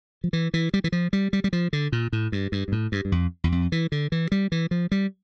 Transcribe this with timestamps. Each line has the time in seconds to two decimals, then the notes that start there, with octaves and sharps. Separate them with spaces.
0.24 F3
0.33 E3
0.54 E3
0.74 G3
0.84 E3
0.92 F3
1.13 G3
1.33 G3
1.44 G3
1.53 F3
1.73 D3
1.92 A#2
2.13 A2
2.32 G2
2.52 G2
2.68 G2
2.72 A2
2.92 G2
3.05 G2
3.12 F2
3.44 E2
3.52 F2
3.72 E3
3.92 D3
4.12 E3
4.32 G3
4.52 E3
4.71 F3
4.92 G3